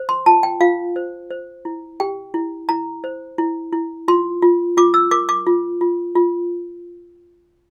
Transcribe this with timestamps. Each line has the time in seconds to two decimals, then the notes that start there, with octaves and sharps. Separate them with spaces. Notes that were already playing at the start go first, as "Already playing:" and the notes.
Already playing: C5
0.09 C6
0.26 F4 A5
0.43 G5
0.60 F4 F5
0.96 C5
1.30 C5
1.65 E4
2.00 G4 G5
2.34 E4
2.69 E4 A#5
3.04 C5
3.38 E4
3.73 E4
4.08 F4 C6
4.42 F4
4.77 F4 D6
4.94 E6
5.11 A#4 D6
5.29 D6
5.47 F4
5.81 F4
6.15 F4